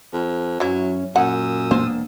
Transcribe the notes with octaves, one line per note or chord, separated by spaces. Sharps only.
F2
F#2 E3 F#3 C#4 E4
F#2 A#2 F#5 D#6 E6
E1 A#3 D4 C5